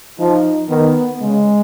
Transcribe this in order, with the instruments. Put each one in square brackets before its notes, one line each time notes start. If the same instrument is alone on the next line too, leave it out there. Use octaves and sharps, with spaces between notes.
[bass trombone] F3 [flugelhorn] D#4
[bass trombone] D#3 [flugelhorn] B3
[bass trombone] C#3 [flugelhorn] G#3